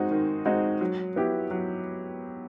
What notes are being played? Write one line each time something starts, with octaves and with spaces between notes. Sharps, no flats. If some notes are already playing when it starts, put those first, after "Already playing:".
Already playing: G#3 C4 D#4 F#4
D#3
G#3 C4 D#4 F#4
F#3
B3 E4 G4
F#3